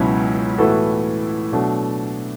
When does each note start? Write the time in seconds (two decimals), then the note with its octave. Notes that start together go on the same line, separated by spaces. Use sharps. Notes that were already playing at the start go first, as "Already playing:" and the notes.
Already playing: C#2 B2 F#3 C#4 E4
0.58 A2 E3 B3 F#4 A4
1.52 B2 F#3 A3 D4